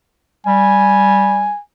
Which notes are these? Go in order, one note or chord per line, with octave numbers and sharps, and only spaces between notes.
G3 G#5